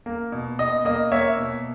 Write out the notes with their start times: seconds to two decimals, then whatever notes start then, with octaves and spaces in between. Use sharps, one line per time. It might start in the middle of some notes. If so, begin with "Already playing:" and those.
0.06 A#3
0.32 B2
0.59 B2 D#5
0.85 A#3 D#5
1.12 A#3 C#5 E5
1.37 B2